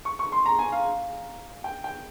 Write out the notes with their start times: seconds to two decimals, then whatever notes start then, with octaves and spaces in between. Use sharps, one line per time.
0.05 C#6
0.19 C#6
0.32 C6
0.46 A#5
0.59 G#5
0.72 F5
1.64 G5
1.84 G5